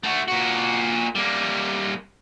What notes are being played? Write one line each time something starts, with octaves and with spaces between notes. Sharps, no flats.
A3 F#4
A#2 F#4
G3 A#3